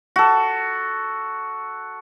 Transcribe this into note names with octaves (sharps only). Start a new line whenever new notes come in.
F#4 A4